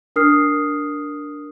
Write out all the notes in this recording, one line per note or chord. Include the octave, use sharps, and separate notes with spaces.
D4 A#4 D#6 F6 C7